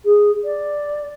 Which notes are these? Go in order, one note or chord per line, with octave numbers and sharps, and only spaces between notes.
G#4
D5